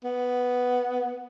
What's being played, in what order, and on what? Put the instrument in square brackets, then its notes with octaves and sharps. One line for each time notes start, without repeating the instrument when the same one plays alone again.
[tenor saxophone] B3